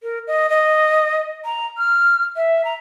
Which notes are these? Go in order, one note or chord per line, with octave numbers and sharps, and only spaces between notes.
A#4
D#5
D#5
A#5
F6
E5
A#5